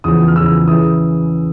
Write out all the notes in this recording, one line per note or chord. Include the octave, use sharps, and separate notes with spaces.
E2 C#3 F3 D#6
F6
E2 C#3 F3 E6
C#3 E3 D#6